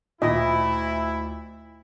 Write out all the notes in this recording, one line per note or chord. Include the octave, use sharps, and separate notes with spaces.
D2 A#2 D#3 E4 D#5